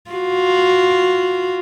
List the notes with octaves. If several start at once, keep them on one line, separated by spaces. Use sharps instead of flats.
F4 F#4